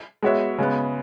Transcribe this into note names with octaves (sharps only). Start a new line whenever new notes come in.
G#3 B3 F#4 C#5 E5
C#3 G#3 B3